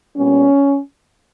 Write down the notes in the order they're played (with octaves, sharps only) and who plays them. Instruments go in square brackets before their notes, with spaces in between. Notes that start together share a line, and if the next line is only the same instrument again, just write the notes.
[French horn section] A#2 G3 B3 C#4